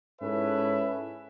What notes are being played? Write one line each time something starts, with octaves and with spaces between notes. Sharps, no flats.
G#2 C#4 E4 A4 B4 E5